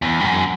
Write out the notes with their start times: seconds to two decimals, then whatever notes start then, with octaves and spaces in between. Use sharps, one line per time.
0.02 E2
0.20 G2
0.25 F#2